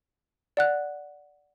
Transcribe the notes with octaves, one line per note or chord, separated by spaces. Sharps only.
D5 F#5 F#6